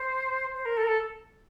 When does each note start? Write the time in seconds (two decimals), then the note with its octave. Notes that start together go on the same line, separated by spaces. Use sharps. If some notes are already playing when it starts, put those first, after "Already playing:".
Already playing: C5
0.55 C5
0.65 A#4
0.77 A4
0.83 A#4
0.87 A4